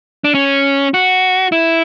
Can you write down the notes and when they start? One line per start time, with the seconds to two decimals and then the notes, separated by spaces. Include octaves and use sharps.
0.24 D4
0.34 C#4
0.94 F#4
1.52 E4